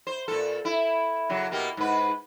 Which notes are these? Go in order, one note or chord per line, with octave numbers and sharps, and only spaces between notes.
C5
A#2 A4
E4
C#3 F#3
B2 A#3 G4
G#2 B4